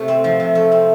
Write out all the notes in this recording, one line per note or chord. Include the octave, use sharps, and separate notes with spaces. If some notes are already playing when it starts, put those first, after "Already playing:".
Already playing: C3 A3
C4
F3
C3
A3
C4